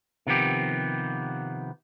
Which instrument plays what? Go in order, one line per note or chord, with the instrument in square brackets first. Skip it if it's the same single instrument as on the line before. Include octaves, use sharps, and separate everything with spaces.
[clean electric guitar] C3 D#3 F3 B3 G4